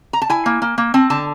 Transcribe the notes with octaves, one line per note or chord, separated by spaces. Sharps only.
A#5
A5
E4 G#5
A#3
A#3
A#3
C4 A5
D3 A5